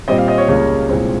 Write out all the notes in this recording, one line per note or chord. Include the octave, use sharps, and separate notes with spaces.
A#2 G3 C4 D#5
F5
D#5
C#5
C#2 C#3 G3 A#3 C#5
C2 A#2 G#3 C4